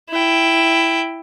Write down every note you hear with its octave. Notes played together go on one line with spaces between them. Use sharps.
E4 G5